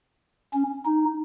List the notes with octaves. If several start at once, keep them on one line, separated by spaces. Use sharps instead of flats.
C#4
D#4